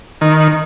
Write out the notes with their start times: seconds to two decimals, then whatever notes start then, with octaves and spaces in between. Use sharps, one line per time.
0.21 D#3